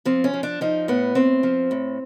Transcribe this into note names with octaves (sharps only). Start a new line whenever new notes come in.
F3 C4
C#4
F3
D4
F3 D#4
A2 B3
A2 C4
F3
A2